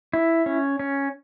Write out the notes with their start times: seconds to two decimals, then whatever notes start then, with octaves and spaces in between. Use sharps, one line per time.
0.13 E4
0.46 C#4
0.79 C#4